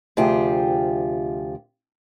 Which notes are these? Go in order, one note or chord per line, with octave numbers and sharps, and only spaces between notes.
D2 C3 F3 F4 G4 G#4